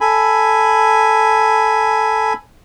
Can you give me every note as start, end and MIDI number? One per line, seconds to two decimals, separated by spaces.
0.01 2.33 69
0.01 2.33 80
0.01 2.33 83